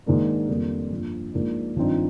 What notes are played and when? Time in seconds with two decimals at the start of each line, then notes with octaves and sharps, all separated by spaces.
0.06 G#2 D#3 A#3 D4
0.49 F2 D#3 G3 A#3 D4
0.91 G2 F3 A#3
1.33 G#2 F3 A#3 D4
1.76 G#1 G2 F3 C4 D#4